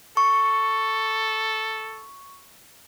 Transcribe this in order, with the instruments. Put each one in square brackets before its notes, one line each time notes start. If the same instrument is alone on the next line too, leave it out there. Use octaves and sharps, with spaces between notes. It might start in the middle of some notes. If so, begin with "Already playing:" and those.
[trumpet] A4 [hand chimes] C#6